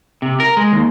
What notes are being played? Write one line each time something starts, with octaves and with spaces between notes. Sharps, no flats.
C3
A#4
G#3
D#2